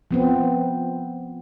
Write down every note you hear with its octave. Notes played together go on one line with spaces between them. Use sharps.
F3 B3 C4